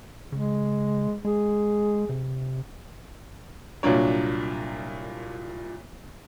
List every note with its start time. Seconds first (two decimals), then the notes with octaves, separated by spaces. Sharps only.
0.32 C#3 G#3
1.25 G#3 G#4
2.09 C3
3.83 C2 A#2 F#3 D4 C#5